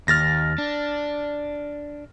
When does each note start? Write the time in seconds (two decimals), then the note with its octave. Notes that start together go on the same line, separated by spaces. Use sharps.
0.08 D#2 F6 A6 A#6
0.58 D4